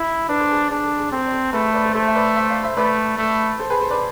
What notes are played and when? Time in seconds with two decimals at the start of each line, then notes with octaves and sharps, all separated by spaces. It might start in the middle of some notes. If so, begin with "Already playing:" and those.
Already playing: E4
0.29 D4 B4 D5
0.40 A4 C5
0.49 G#4 B4
0.60 G#4
0.71 D4 G#4
0.84 A4
0.98 G#4
1.12 C4 A4
1.27 D5
1.32 A4 C5
1.53 A3 G#4 B4
1.73 B4 D5
1.84 A4 C5
1.94 A3 A4 C5
2.07 E5
2.15 B4 D5
2.36 C5 E5
2.50 D5 F5
2.63 C5 E5
2.77 A3 B4 D5
3.18 A3
3.59 A4 C5
3.70 G#4 B4
3.81 A4 C5
3.90 B4 D5